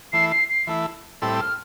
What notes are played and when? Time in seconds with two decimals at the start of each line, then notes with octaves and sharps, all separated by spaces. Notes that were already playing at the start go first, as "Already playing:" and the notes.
0.13 E3 A3 E4 C7
0.31 C7
0.49 C7
0.67 E3 A3 E4
1.22 A2 G3 C4 E4 A4 E6
1.40 F6